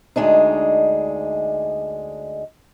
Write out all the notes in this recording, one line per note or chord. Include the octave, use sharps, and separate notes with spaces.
D2 G#3 D4 D#4